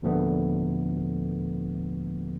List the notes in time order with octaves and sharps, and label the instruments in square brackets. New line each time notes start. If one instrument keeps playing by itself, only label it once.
[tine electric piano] D#2 A#2 D3 F3 A3 B3